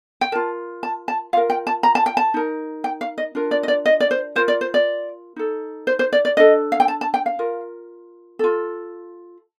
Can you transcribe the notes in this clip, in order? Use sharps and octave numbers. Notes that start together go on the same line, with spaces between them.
G5
F4 A#4 A5
A5
A5
F4 A#4 F5
G5
A5
A#5
A5
G5
A5
D#4 A#4
G5
F5
D#5
D4 F4 A#4
D5
D#5
D5
D#5
D5
C5
F4 A#4 C5
D5
C5
D5
D#4 A4
C5
C5
D5
D5
D4 A4 D#5
F5
G5
A5
A5
G5
F5
F4 A#4
F4 A4